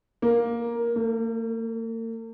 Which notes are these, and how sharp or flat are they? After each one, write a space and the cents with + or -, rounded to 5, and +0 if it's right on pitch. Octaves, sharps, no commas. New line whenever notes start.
A#3 +10
A#3 -45